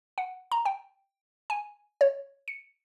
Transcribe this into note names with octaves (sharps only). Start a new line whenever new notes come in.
F#5
A#5
G5
G#5
C#5
C#7